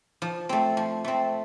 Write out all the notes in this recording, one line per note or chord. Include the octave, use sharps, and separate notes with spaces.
F3
A3 C4
F3
A3 C4